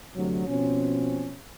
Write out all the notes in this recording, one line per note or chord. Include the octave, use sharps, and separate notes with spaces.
D2 C3 F#3
B2 F3 C4 C#4